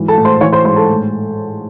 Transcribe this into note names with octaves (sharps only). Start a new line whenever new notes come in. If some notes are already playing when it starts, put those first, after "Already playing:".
Already playing: G#2 E3 F#3
A4 A5
A2
C5 C6
E3 C#5 C#6
C5 C6
G#2 C5 C6
A4 A5
A2